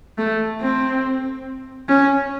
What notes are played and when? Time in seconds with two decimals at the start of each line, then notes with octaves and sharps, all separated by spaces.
0.18 A3
0.61 C4
1.89 C#4